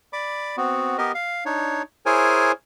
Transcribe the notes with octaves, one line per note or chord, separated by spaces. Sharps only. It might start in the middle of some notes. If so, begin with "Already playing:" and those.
D5 B5 D6
B3 C4 F#4
B3 G4 A#4 D#5
F5
D4 D#4 C#5
E4 G#4 A#4 C5 C#5 G#5